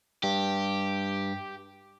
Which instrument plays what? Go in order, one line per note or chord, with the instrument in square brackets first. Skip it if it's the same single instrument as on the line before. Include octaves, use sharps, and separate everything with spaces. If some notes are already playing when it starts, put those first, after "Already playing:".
[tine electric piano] G2 [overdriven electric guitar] G4